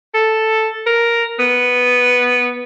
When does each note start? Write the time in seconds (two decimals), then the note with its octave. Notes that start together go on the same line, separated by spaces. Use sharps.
0.14 A4
0.86 A#4
1.39 B3